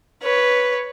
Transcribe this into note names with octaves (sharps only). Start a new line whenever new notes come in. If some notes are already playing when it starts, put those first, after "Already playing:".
B4 C#5